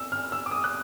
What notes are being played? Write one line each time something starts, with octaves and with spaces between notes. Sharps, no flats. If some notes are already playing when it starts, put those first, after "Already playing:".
Already playing: E6
F6
E6
D6
D#6
F#6